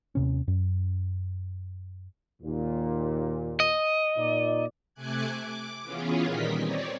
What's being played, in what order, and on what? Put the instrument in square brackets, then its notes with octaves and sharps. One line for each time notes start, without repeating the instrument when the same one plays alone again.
[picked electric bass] D#2 C3 C#4
F#2
[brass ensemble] D#2 A#2
[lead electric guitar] D#5
[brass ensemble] A#2 D#4 D5
[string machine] C3 A3 G#5 D6 F#6 G#6
D6
E3 B3 C#4 F4 G#4
A#2 D#3 G3 A#4 D#5 B6
C4 C#5 D5